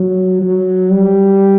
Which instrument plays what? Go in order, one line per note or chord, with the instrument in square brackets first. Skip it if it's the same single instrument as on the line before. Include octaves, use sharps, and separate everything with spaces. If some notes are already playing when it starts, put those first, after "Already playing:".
Already playing: [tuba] F#3
F#3
G3